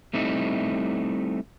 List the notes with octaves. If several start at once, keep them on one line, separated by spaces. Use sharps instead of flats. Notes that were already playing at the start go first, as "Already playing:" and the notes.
G3 A3 C4 D#4 E4